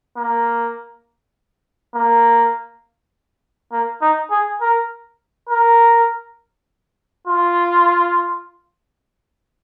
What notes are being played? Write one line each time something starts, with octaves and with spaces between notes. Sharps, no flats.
A#3
A#3
A#3
D#4
G#4
A#4
A#4
F4